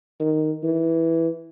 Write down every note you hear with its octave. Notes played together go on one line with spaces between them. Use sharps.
D#3
E3